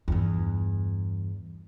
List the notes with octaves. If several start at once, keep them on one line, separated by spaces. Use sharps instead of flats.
E2 G2